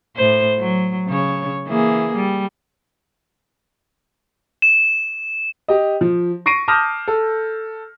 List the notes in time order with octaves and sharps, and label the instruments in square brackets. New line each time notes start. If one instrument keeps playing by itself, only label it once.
[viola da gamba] A2 C5
F#3
C#3 C#5
E3 A#3 G#4
G3
[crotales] E7
[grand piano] G4 D#5
F3
C#6 A#6 C7 D7 D#7
A5 D6 D#6 F6 G6 A#6
A4